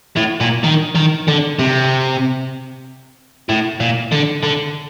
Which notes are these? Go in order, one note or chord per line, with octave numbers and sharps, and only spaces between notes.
A2
A#2
D#3
D#3
D3
C3
A2
A#2
D3
D3